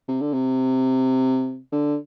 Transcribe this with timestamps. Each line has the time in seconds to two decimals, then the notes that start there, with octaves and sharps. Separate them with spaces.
0.08 C3
0.21 D3
0.33 C3
1.72 D3